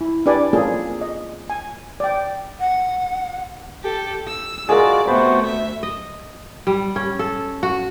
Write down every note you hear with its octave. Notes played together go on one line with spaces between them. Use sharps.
E4
D4 G4 B4 D5 G#5
A#3 C4 C#4 F4 G#4 A4
D#5
G#5
D5 G5
F#5
G4 A4
E6
G#3 F4 F#4 G#4 A#4 D5
C3 A3 B3 F#4 C5 B5
D2 E5
D#5
G3
C#4
A4
F#4